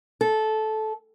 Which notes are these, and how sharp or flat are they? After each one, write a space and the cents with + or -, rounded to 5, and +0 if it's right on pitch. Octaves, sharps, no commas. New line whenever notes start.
A4 -15